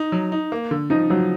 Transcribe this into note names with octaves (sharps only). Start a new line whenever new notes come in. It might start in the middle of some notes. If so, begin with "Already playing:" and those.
Already playing: D#4
F#3
D#4
A#3
D3
F3 D#4
F3 F#3